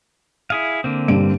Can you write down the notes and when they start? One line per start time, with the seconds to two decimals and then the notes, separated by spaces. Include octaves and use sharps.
0.50 E4 G#4 F5
0.84 D3 A#3 C4
1.08 G2 D7